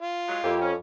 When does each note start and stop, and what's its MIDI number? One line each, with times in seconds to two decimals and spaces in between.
0.02 0.61 65
0.28 0.38 54
0.28 0.38 56
0.43 0.75 41
0.43 0.56 58
0.43 0.56 64
0.43 0.56 67
0.61 0.73 61